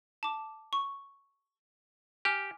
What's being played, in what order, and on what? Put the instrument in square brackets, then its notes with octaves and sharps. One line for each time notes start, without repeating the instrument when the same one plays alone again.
[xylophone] A5 D6
C#6
[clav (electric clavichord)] G4 [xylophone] G#5 D6 F6